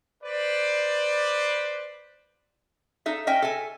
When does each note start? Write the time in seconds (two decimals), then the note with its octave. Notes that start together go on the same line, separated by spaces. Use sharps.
0.23 B4 C5 D5
3.06 D#4 A4 E5
3.27 C#4 D#5 E5 G5
3.42 A4 G#5